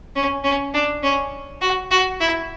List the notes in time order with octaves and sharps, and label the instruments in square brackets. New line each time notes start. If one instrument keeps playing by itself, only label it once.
[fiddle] C#4
C#4
D4
C#4
F#4
F#4
E4